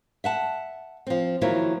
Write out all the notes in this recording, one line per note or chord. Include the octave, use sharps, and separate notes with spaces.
E5 F#5 A5
F3 C4
D#3 F3 F#3 A#3 E4